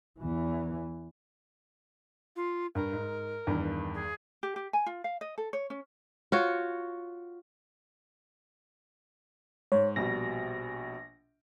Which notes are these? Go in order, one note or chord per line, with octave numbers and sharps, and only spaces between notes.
E2 E3
F4
G2 A#4
G#2
E2 G2 D#3
G#4
G4
G4
G#5
F4
F5
D#5
A4
C#5
C#4
F4 F#4 C#5
G#2 C#5
A#1 B2 G3 A#6